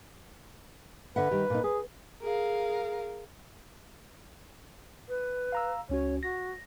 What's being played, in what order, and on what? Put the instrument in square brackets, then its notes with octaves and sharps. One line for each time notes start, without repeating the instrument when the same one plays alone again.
[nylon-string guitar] D3 E5 F#5 [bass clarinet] B4
[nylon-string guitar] D#3 G3 G4
A#2 D#4
[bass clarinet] G#4 [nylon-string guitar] B4
[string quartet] G#4 A#4 F5
[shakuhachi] B4
[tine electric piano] F5 A#5 E6
[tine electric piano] C#2 C#4 F#4 [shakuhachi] C#5
[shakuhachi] F#4 [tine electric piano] A#6